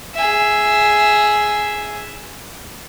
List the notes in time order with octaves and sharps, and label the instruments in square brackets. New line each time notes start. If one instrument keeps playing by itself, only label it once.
[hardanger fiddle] G#4 E5